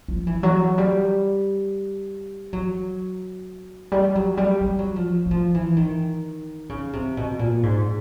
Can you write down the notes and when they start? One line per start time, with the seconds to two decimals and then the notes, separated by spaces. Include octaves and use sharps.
0.08 F3
0.27 E3
0.43 F#3
0.78 G3
2.53 F#3
3.92 G3
4.15 F#3
4.37 G3
4.61 G3
4.79 F#3
4.96 F3
5.26 F#3
5.31 F3
5.54 E3
5.77 D#3
6.69 C#3
6.93 C3
7.17 B2
7.39 A#2
7.63 G#2